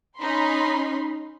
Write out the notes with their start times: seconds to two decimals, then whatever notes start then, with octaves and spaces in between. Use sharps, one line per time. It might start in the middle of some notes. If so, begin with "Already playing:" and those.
0.18 C#4 D#4 B5 C6